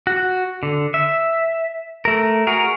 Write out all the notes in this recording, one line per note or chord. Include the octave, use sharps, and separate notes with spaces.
F#4
D3
E5
A3 A#4
F#4 G#4 A#4